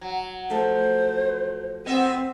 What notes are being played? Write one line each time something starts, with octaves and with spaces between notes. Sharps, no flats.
F#3
F3 A3 A4 C5
B3 C4 D#5 E5